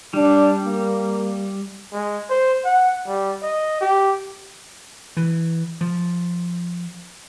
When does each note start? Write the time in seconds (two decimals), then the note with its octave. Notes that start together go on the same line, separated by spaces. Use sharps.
0.13 G3 D4
0.65 A#3
1.93 G#3
2.30 C5
2.65 F#5
3.07 G3
3.42 D#5
3.81 G4
5.17 E3
5.81 F3